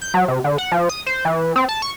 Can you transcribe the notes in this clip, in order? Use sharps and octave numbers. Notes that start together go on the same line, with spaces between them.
G6
F#3
C3
D3
F#5
F3
D#6
C5
E3
C4
A5
C#6